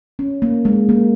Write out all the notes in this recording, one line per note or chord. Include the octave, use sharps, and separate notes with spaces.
C#4
A#3
G#3
A#3